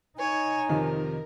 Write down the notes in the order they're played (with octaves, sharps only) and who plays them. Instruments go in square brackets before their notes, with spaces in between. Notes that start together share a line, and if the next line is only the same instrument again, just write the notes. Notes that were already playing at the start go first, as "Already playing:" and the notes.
[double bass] D#4 [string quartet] C#5 [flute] G#5
[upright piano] F2 C3 D#3 [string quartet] A#4